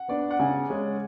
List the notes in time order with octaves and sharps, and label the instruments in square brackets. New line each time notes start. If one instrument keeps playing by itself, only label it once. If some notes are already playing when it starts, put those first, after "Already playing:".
Already playing: [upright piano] F#5
[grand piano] B3 D4 [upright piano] D5
[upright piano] F#5
[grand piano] C#3 [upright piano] G#5
[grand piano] G#3 C#4